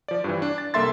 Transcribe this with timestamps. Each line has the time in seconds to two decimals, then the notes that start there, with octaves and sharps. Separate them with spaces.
0.08 F3 D5
0.24 G2 E3
0.42 D4
0.58 A6
0.74 C2 A#3 A4 E5 C6 A6